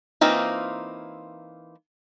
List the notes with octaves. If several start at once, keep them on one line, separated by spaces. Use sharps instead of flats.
E3 A#3 C4 D#4 F4